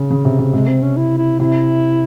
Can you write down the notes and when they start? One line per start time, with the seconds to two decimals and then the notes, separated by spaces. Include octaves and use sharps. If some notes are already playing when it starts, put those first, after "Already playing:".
Already playing: C#3
0.10 C#3
0.25 C3
0.39 C3
0.53 C3 G#3
0.68 C4
0.82 C#4
0.97 E4
1.18 E4
1.39 C3 E4